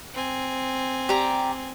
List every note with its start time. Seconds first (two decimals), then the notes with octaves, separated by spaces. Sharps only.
0.14 C4 G#5
1.09 G4 D5 A#5